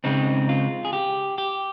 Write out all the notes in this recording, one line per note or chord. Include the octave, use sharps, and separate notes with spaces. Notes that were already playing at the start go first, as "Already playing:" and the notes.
C#3 G#3 C4 D#4
F4
G#4
G4
G4